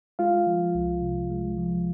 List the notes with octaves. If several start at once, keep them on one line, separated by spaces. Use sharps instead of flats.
G#3 F4 F5
F3
C2
C3
G#3
F3